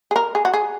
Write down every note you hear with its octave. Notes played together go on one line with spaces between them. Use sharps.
G#4
A#4
G#4
F#4
G#4